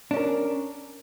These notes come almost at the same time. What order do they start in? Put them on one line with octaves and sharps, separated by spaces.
D4 C#4 A#4